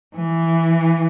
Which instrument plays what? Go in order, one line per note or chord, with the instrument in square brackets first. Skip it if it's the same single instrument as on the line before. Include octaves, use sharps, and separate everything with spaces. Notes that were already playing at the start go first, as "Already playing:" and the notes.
[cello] E3